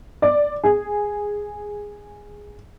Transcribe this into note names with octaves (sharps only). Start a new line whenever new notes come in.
D5
G#4